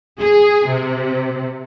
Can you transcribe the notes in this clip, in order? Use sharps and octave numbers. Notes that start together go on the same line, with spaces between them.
G#4
C3